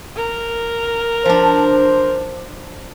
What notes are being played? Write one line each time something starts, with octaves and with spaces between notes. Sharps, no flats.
A#4
F3 D4 C5